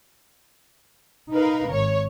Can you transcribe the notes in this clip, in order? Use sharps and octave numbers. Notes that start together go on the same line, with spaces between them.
D#4 A#4 B4 F5
G#1 C#5 C#6